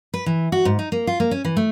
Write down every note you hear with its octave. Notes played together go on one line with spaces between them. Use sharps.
B4
E3
F#4
G#2
D#4
A#3
F4
A#3
C#4
E3
A3